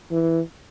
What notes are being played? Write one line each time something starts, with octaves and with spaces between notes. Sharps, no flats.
E3